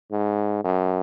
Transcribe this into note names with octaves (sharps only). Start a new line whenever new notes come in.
G#2
F#2